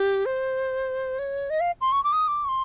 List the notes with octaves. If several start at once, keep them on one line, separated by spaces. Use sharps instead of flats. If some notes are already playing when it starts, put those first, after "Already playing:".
Already playing: G4
C5
C#5
D#5
F5
C6
C#6
D6
D#6
D6
C#6
C6